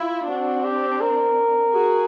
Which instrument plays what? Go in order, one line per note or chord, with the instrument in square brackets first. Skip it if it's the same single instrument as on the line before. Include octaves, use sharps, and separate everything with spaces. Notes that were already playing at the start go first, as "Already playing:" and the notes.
Already playing: [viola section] E4 [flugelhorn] F4
[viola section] C4 D4 [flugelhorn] F#4
[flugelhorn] G4
A#4
[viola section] F#4 G#4